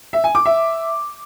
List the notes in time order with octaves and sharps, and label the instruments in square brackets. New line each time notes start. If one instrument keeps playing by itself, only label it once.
[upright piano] E5
G#5
D6
E5